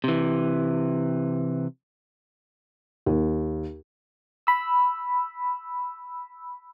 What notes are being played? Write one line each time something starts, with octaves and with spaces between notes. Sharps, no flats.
C3 E3
D#2
B5 E6